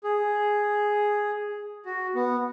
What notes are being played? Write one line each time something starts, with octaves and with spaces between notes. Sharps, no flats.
G#4
F#4
B3